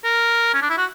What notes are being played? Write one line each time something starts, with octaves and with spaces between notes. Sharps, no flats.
A#4
C#4
D4
E4
F#4